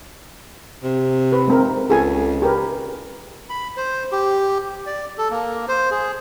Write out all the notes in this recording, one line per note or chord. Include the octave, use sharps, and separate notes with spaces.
C3
B4
G#3 C4 A#4
C#2 G#4 A4 G#5
G4 A#4 B4
B5
C5
G4
D5
A4
A#3
C5
G#4